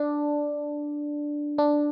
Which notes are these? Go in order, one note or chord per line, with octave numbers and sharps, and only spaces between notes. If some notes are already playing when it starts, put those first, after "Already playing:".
Already playing: D4
D4